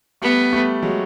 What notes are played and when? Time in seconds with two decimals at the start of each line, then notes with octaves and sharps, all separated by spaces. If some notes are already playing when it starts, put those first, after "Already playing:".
0.22 G3 A3 B3
0.53 G3 A3
0.83 F#3 G#3